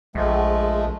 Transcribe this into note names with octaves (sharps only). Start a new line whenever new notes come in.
A#1 F3 G#3 A3